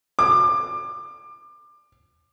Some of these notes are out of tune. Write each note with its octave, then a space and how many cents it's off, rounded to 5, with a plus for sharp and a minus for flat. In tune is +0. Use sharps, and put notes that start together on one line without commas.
D6 +25